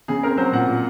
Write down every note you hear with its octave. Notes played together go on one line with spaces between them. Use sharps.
C#3 G#4
C4 A#4
F#3 C5
A#2 F#5
A#2